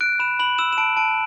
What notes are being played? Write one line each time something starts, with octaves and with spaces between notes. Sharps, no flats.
F#6 D7
B5 E7
B5 F#7
E6 E7
E7
A5 D7
A5 D7